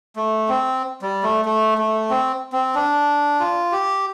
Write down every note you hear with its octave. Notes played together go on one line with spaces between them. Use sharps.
A3
C4
G3
A3
A3
A3
C4
C4
D4
F4
G4